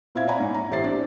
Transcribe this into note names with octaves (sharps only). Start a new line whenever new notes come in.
A#2 C4 E4 E5 F5 G#6
C#5 D5 F#5 G#5 A#5 B5
G#2
A#5
A1 G4 C5 E5 A6 C7
C4 D4 G4